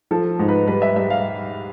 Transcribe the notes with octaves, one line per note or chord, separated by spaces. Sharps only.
F3 A4
G#2
B4
G3 B4
E5
G3 E5
F5